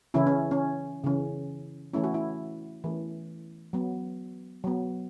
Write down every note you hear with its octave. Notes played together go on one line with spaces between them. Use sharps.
C#3 E3 C#4 E4
C#4
C#4
C#3 E3 C#4
E3 A3 C#4 E4
F#4
E4
E3 A3 C#4
F#3 B3
F#3 B3